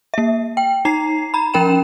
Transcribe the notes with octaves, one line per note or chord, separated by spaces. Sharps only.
A#3 E5
G5
D#4 A#5 C7
A#5 B5
F3 C#4 A#4 G5 B5 E7